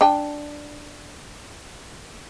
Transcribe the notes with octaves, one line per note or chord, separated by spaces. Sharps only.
D4 G5 A5